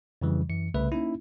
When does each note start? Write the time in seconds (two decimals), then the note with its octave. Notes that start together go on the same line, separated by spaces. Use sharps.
0.22 F2 C#3 E3 G3
0.49 F#2 E3 C#7
0.74 C2 C#3 A3 B4 E5
0.92 A#3 C#4 D#4 E4